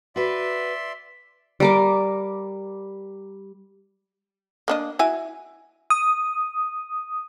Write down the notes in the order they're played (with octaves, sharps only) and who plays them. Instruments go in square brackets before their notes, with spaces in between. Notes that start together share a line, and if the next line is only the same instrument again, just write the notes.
[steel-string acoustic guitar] F#4 B4 [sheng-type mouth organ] D5 E5 C6
[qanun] G3 A#4 D6
[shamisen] A#3 D4 D#5
E4 F#4 G#5
[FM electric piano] D#6